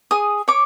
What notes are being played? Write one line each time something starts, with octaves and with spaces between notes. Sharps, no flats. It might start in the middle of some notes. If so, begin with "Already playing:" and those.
G#4 D#6
C#5 D6